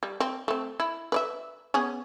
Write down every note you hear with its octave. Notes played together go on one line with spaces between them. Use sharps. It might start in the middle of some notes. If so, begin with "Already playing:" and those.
G3
C4
A3 C4
E4
B4 D5 E5
B3 C#4 G#4